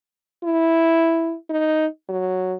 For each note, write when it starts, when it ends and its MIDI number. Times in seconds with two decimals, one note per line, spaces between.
0.44 1.34 64
1.50 1.86 63
2.09 2.54 54